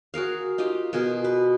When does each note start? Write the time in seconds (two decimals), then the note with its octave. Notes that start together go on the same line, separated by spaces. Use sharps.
0.14 F#4 G#4 A#4 F5
0.58 D#4 F4 G4 D#5
0.93 B2 F4 G#4 A#4
1.24 B4